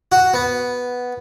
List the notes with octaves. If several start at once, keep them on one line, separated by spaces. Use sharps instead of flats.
F#4
B3